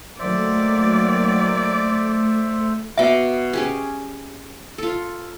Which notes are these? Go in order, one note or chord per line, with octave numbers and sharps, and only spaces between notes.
D#3 F#3 A3 A#3 C5 D5 E5
B2 E5 D6
C#4 G4 G#4
F4 A4